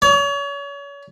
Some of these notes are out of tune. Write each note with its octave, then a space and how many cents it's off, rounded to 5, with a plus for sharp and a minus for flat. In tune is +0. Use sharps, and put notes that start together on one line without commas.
C#5 +35